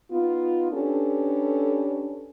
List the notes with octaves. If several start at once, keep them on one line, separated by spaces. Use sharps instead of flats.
B3 D#4 F4
C#4 D4 G4 A4 B4